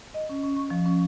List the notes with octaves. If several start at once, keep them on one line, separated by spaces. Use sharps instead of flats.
D#5
C#4
C#4
C#6
F3
C#4